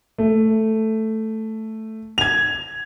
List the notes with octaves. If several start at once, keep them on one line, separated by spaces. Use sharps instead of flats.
A3
G#6 F7